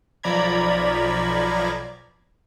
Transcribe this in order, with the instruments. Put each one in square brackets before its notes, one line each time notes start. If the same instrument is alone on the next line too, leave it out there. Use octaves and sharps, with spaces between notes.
[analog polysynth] B1 F3 D5 A#5 B5 G#6